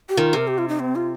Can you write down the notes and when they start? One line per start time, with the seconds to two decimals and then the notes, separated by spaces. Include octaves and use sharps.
0.09 G4
0.17 D#3 F4
0.33 C3 A#4
0.48 G4
0.58 F4
0.68 D#4
0.80 C4
0.95 F4